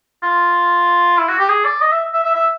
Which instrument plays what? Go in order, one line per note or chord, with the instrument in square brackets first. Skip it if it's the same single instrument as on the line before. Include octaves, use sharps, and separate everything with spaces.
[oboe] F4
E4
F#4
G4
G#4
D5
D#5
E5
E5
E5
E5